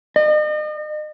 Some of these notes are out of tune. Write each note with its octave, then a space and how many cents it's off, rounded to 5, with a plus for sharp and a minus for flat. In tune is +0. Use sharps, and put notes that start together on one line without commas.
D#5 -40